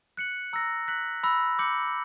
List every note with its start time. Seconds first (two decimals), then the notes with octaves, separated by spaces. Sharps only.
0.17 F#6 C#7 F#7
0.53 A#5 E6 A#6
0.88 F#6 B6 F#7
1.23 B5 E6 A#6
1.59 D6 G6 C#7 F#7